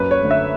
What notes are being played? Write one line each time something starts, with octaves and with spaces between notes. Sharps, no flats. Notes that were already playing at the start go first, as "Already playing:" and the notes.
Already playing: F#2 B4
C#5
D3 A3
E5